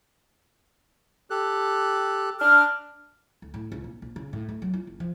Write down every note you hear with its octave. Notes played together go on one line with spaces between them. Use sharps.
G4 A4 F#6
D4 F6
D2
A2
C#2
A#1
A#1
C#3
A2
A3
F#3
F4
F#1
F3